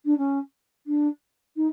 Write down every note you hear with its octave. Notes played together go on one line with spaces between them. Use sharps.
D4
C#4
D4
D#4